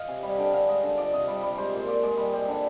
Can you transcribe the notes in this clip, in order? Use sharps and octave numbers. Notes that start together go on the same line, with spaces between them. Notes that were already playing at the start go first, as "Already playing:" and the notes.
Already playing: D#5 F5
C3 G#5
G3
D3 G5
D3 F5
G#3 D#5
D3
F3 D5
C3 D#5
G3 D5
G3
G#3 C5
A#2
A#2 D5
G#3 D5
G3
G3
D3